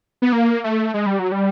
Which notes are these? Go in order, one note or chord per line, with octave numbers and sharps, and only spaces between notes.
B3
A#3
A3
G#3
G3
F#3
G3